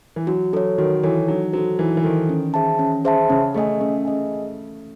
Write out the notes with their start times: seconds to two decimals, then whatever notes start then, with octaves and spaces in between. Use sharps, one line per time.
0.16 E3
0.27 F#3 F#4
0.53 F#3 A4 C#5
0.78 D#3 F#4
1.03 E3 A4 C#5
1.28 F#3 D#4
1.53 F#3 A4 C5
1.79 E3 D#4
1.97 E3
2.04 D#3 A4 C5
2.29 C#4
2.54 G#4 C5 E5 A5
2.79 C#4
3.05 G#4 C5 E5 A5
3.30 C#3 C#4
3.54 A3 G#4 D#5 G#5
3.80 A3 C#4
4.05 G#4 D#5 G#5